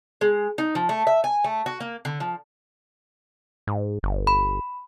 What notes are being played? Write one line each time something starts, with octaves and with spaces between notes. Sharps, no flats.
G#3
D#4
F3
A3
E5
G#5
A3
F#4
A#3
D3
F3
G#2
G1
B5